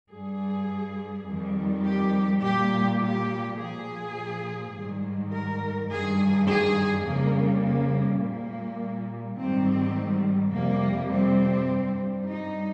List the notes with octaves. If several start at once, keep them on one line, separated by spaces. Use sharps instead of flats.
G2 G3 G#4
F2 D#3 G3
G4
A#2 G3 G4
G4
A#2 F3 G#4
G#2 D#3 G3
A#4
G2 D#3 G3 G#4
G#4
F2 C#3 G3 A#3
A#3
A#2 G3 A#3
G#2 D#3 G3 C4
F2 C3 G3 A#3
C4
G2 G3
D#4